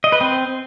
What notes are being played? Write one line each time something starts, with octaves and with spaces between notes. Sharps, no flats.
D#5
B4
C4